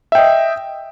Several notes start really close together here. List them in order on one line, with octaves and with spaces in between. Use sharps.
E5 G5 D#5